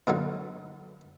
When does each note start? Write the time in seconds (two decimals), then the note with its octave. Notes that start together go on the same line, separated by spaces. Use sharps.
0.07 A#2 D3 F#3 D#4